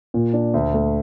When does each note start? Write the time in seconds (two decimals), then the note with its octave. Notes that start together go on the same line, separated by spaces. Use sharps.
0.14 A#2
0.34 D4
0.54 D2
0.74 A3